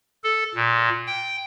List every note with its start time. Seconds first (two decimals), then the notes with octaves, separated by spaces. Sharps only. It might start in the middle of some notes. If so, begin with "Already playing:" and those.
0.24 A4
0.55 A#2
1.07 G5